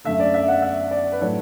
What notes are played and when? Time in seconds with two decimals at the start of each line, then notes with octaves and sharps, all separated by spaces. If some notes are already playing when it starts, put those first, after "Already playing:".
0.05 F#2 D3 A3 E5
0.20 D5
0.34 E5
0.48 F#5
0.62 E5
0.91 D5
1.12 B4
1.21 A2 F#3 A3 D4 C#5